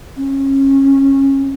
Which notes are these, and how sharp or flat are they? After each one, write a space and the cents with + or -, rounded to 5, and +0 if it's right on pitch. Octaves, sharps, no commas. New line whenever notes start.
C#4 -25